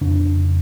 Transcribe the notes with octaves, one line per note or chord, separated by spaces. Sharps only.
F2 C#3 D4